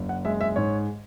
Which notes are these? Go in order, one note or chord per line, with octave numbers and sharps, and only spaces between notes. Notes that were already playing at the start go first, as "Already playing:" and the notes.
Already playing: F#1
F#5
G#3 E5
E5
G#2 C#5